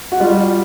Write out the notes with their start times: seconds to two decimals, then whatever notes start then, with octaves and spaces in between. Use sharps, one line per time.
0.12 F#4
0.20 G3 F4